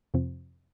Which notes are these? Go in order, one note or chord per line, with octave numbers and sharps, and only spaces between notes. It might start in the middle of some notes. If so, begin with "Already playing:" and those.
F2 C3 F3 C4